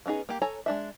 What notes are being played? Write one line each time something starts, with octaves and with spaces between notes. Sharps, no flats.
B3 C#4 D#4 G#4
A#3 G4
A4 C#5 G#5 A#5
G#3 D4 E5